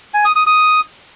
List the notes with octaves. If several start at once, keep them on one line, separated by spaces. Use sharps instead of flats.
G#5
D#6
D#6
D#6